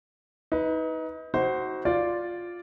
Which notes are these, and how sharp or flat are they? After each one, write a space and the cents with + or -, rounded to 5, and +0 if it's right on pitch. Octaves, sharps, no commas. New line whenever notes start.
D#4 +30 B4 +0
D#4 +40 F#4 +20 C5 +0
F4 +5 D5 +0